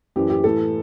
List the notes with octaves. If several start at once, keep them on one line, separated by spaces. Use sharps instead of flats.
F#2 E3 G4
G4
A2 E3 A4